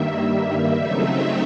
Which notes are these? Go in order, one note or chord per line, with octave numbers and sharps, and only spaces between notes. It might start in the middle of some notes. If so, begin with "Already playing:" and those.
Already playing: G2 D#3 G3 A#3 E5
E5
C#3 F#3 A3 C4 D#4